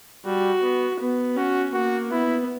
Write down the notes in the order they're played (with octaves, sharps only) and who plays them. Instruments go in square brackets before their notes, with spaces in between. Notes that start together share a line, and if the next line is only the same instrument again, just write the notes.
[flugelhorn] G3 [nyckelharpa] F#4
[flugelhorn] B3
[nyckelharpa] B3
[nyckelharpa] C#4 [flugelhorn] F#4
[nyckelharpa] A#3 [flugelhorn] F#4
[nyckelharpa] B3 [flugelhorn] E4